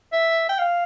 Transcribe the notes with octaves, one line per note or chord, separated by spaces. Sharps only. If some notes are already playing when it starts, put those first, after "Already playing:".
E5
G5
F5